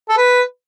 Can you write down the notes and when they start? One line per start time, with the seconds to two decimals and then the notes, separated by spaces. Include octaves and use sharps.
0.09 A4
0.17 B4